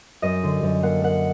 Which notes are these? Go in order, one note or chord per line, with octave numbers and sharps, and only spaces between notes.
F#2 D#5
D3
F#2
A#3 F#5
A#3 F#5